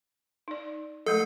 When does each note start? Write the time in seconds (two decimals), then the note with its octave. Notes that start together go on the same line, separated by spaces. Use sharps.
0.48 D#4 D5
1.06 F3 G#3 A3 A4